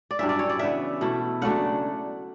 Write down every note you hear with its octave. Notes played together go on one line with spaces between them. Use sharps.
D5
G2 F#3 C#4 E4 E5
D5
C#5
D5
C#3 E3 B3 E5
B2 A3 E4
C#3 F#3 A3 D4 F#5